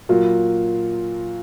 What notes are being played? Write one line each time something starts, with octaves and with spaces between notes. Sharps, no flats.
A#2 F#3 A#3 F4